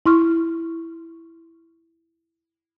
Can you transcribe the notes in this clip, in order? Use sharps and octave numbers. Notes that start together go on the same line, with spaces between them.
E4 C6 C#6 F6